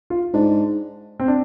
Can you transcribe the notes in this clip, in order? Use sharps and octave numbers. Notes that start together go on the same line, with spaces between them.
F4
G#2 D4
C4
D4